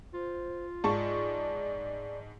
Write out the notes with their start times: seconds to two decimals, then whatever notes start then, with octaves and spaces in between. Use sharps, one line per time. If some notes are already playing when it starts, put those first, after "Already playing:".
0.14 F4 C5
0.84 G#2 D5 A5 C#6